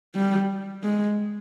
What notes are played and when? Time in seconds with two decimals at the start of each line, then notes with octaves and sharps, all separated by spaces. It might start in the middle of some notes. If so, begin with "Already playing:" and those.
0.15 G3
0.83 G#3